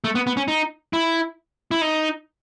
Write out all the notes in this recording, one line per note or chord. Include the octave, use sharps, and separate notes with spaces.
A3
B3
B3
C#4
D#4
E4
E4
D#4